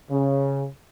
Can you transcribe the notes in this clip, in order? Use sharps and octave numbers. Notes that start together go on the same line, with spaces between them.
C#3